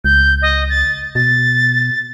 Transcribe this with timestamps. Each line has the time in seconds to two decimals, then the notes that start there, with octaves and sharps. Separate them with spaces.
0.04 C#2 G6
0.42 D#5
0.70 A6
1.15 B2 A6